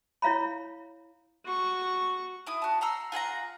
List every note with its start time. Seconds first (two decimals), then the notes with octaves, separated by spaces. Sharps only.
0.22 E4 C#5 F5 A#5 B5
1.46 F#4 C#6
2.47 E4 D#6
2.62 F#4 A5
2.81 F#5 A#5 C6 E6
3.12 F4 G#4 F#5 A#5